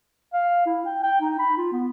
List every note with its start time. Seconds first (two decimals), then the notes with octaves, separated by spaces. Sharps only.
0.33 F5
0.66 E4
0.85 G5
1.03 G5
1.21 D#4
1.39 B5
1.57 F4
1.72 B3